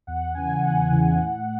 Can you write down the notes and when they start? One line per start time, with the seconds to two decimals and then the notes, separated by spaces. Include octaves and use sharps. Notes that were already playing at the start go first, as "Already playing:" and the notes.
0.07 E2 F#5
0.34 C#3 E3 G#5
0.62 E2 F#5
0.90 C#3 E3
1.18 A2